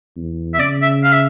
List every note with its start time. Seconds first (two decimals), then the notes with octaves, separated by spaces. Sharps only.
0.16 E2
0.54 E5
0.60 C#3 D5
0.82 E5
1.04 F5
1.13 E5